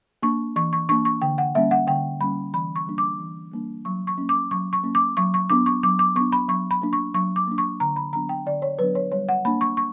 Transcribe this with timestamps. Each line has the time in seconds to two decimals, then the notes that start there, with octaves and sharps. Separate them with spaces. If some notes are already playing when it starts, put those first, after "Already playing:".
0.23 A#3 D4 C#6
0.56 E3 C#6
0.73 C#6
0.89 A#3 D4 C#6
1.05 C#6
1.22 D3 G5
1.38 F#5
1.55 G3 A#3 C#4 E5
1.71 F#5
1.87 D3 G5
2.21 G3 A#3 C#4 B5
2.54 E3 B5
2.76 C#6
2.87 G3 A#3 D4
2.98 D6
3.19 E3
3.52 G3 A#3 D4
3.85 F#3 C#6
4.07 C#6
4.18 A#3 C#4
4.29 D6
4.51 F#3 C#6
4.73 C#6
4.84 A#3 C#4
4.95 D6
5.17 F#3 C#6
5.34 C#6
5.50 B3 D4 D6
5.66 C#6
5.83 F#3 D6
5.99 D6
6.16 B3 D4 C#6
6.32 B5
6.48 F#3 C#6
6.71 B5
6.82 A#3 D4
6.93 C#6
7.14 F#3 C#6
7.36 D6
7.48 A#3 D4
7.58 C#6
7.80 D3 A#5
7.96 B5
8.13 F#3 B3 D4 A#5
8.29 G5
8.46 D3 D5
8.62 C#5
8.79 F#3 B3 D4 B4
8.95 C#5
9.12 G3 C#5
9.29 F#5
9.45 A#3 D4 B5
9.61 C#6
9.77 C#6